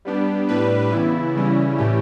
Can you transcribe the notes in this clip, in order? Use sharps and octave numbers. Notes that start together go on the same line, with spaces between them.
G3 B3 D4 G4
A2 G3 D4 G4 B4
C#3 E3 B3 E4
C#3 E3 G3 C#4 E4
A2 E3 A3 C#4 G4